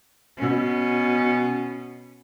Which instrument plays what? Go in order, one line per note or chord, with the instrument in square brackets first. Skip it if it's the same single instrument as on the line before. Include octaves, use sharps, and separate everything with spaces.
[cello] B2 C#4